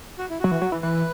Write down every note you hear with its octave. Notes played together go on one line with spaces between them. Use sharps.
F#4
E4
F#3 F#4
E3
F#3
E3
E3 B4